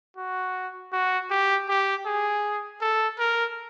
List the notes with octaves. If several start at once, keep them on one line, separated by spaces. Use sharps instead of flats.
F#4
F#4
G4
G4
G#4
A4
A#4